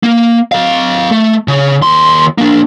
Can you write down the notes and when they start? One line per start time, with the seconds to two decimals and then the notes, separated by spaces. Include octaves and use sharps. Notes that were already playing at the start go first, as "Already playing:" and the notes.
0.03 A#3
0.52 A4 F5
1.11 A3
1.48 C#3
1.82 D#2 C6
2.38 A#3 D4